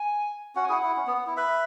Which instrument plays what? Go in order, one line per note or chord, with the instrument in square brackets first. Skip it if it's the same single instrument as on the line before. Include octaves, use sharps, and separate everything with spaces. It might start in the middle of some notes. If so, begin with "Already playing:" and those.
Already playing: [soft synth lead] G#5
[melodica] C#4 F#4 [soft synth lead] F#5
[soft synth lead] G#5
[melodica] E4 G#4 [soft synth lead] F#5
[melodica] E4
C#4
B3
B3
E4
[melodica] B4 E5 [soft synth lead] B5